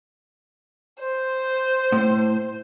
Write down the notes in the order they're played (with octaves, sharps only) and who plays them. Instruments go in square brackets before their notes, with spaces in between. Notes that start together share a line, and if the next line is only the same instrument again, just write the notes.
[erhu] C5
[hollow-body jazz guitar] A2